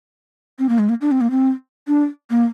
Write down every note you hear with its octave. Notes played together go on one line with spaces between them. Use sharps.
C4
A#3
G#3
A#3
D4
C4
A#3
C4
D4
A#3